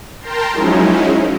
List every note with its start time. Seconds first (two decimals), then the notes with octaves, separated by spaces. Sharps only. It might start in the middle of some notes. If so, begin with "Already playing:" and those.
0.20 A#4 G5 A5 A#5 C6
0.52 F3 F#3 G#3 C#4 D#4 E4